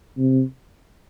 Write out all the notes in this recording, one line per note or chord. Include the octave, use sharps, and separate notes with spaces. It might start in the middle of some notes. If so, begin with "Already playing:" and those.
C3